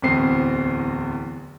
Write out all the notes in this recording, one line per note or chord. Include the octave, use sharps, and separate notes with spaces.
D1 E2 B3 C4 C7